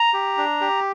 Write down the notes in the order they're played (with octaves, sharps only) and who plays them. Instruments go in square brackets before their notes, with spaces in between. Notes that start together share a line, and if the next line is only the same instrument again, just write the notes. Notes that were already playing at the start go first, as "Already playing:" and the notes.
Already playing: [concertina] A#5
G4
D4
G4